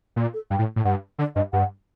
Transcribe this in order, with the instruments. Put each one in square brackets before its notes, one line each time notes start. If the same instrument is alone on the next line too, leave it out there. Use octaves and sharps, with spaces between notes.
[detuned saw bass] A#2
[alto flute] A4
[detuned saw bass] G2 [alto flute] G5
[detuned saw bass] A2
A2
[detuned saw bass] G2 [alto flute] F#5
[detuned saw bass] D3 [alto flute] D5
[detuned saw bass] G2 [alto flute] D#5
[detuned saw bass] G2 [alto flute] F#5